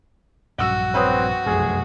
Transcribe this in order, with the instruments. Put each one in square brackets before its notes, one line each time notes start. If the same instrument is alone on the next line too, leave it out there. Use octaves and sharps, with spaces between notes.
[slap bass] A#1 G2 F#3 [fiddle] F#4 [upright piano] F#5 E6
[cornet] C4 [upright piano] B4 C#5 D#6
[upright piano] F1 [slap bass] B1 F#2 B2 [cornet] G#4